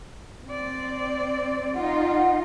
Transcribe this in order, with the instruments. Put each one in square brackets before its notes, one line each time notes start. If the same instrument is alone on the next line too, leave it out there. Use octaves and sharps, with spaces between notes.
[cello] C4 D5
[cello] D#4 F4 [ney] F#5